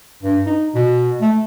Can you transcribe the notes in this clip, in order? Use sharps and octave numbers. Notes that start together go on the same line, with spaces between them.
G2
D#4
B2
A3